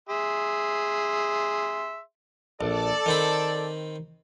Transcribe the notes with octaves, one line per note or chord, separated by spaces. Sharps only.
G#4 E5 C6
A#1 A4 D5
D#3 C4 B5